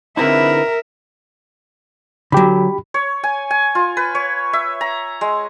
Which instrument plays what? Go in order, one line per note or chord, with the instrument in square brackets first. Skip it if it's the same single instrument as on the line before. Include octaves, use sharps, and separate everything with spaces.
[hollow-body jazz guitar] D3 C4 D#4 [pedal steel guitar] E4 G#4 B4 [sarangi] A#4 [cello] E5
[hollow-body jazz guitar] D3 F#3 [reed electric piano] G4 B5
[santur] C#5
G#5
G#5
F4
B4
C#5
E5
A#5
G#3